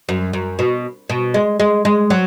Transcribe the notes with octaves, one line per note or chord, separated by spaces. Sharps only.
F#2
F#2
B2
B2
G#3
G#3
G#3
F#3